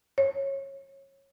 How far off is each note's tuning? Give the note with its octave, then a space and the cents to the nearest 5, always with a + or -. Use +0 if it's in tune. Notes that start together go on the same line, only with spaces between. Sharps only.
C#5 -20